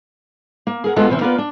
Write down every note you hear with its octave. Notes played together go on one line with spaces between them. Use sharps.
A#3
G#4 A#4 F#5
G#3 B3 D4 F4 F#4 A4
E2 C3 E3 C4 C#4
A#3 B3 F4 B4 C5 D5
D4